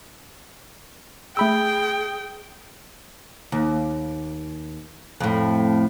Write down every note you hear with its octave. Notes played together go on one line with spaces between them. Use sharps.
A3 G#4 G5 B5 E6
D#2
F2 A2